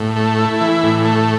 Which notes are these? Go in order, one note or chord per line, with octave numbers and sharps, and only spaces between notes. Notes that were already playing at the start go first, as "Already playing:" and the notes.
Already playing: A2
A3
E4
E3
A2
A3